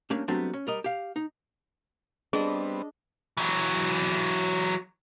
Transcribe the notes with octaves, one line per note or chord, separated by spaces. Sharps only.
G3 A3 A#3 C#4 D4
F#3 G3 A3 B3 C4 D4
C#4
G3 A#4 D#5
G4 F5
D#4
G3 B3 C4 D4 G#4 D#5
E3 F#3